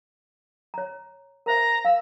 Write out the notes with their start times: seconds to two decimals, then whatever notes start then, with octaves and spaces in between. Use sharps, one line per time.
0.74 C#5 A#5
1.46 A#4 C5 E5 A#5
1.85 F5 E6